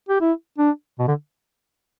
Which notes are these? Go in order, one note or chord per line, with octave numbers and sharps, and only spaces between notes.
G4
E4
D4
B2
D3